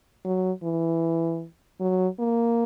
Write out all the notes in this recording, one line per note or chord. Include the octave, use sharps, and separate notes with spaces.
F#3
E3
F#3
A#3